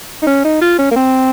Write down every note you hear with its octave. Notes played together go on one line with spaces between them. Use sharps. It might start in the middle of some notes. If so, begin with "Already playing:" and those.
D#4
C#4
D#4
F4
C#4
A#3
C4